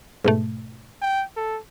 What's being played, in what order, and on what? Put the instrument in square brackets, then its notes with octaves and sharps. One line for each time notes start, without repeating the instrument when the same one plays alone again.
[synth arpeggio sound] G#2 B2 A3
[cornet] G5
A4